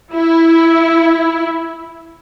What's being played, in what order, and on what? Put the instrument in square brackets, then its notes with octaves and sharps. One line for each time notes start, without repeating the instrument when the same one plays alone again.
[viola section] E4